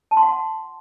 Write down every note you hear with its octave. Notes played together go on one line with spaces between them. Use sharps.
A5
C6
F#5
C6